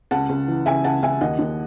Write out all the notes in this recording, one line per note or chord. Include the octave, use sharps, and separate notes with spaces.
C#2 F#5 A5
C#2
E3
C#2 E5 G#5
C#2 F#5 A5
C#2 E5 G#5
D#2 D#5 F#5
D#2